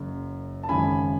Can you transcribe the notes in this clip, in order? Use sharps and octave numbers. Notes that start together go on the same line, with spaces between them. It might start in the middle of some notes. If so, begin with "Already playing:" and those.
Already playing: F#1 F#2 C#3
A5
G#1 F#2 C#3 G#5 B5